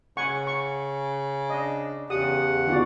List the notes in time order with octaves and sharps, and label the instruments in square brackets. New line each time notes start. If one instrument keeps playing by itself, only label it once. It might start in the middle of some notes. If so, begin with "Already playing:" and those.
[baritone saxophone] C#3 [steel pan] F#5 G#5 C#6
[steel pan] C#6
[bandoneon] D4 [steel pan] D#5
[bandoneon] E2 C#3 F#5 [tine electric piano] G4 [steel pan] D#6
[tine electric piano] D3 B3 D#4 [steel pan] F4 F#4 D5